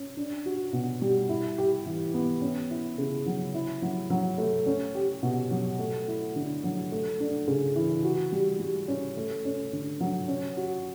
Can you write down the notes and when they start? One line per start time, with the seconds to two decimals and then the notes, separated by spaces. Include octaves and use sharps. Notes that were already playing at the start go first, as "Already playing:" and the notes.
Already playing: C#4
0.17 D4
0.46 F#4
0.73 B2
1.02 G3
1.29 E4
1.58 G4
1.86 E3
2.14 B3
2.41 C#4
2.70 E4
2.98 C#3
3.26 F#3
3.54 E4
3.82 F#3
4.10 F#3
4.38 A3
4.66 C#4
4.95 G4
5.23 B2
5.51 F#3
5.79 A3
6.08 E4
6.36 D3
6.64 F#3
6.92 A3
7.20 D4
7.48 C#3
7.76 E3
8.04 F#4
8.32 G3
8.60 G3
8.88 C#4
9.17 A3
9.45 C#4
9.73 D3
10.01 F#3
10.28 C#4
10.57 F#4